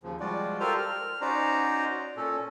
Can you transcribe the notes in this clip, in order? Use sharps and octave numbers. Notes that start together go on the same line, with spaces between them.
D#2 C#3 F3
F3 G3 G#3 F4 F#4 D5
F4 G4 A4 A#4 C5 F6
F6
C#4 D#4 F#4 C5 D5 A#5
A#2 C#4 A4